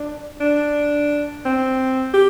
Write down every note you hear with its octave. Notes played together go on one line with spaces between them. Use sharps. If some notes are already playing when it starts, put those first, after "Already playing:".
Already playing: D4
D4
C4
G4